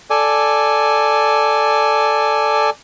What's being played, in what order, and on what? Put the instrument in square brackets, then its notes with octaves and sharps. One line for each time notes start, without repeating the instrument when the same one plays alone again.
[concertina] A4 D5 G#5